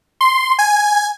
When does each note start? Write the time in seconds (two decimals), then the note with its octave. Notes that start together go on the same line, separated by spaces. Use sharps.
0.21 C6
0.59 G#5